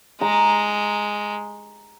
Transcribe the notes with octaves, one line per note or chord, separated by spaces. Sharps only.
G#3 A#5